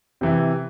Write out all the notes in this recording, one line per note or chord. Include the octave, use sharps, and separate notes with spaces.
C3 E3